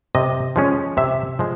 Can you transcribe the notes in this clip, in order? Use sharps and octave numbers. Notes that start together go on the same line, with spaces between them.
C3 D#5
F3 G#3 C#4
C3 E5
F3 G#3